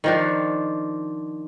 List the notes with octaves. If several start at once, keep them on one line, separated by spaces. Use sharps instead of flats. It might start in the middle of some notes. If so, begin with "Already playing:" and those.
D#3 F3 D4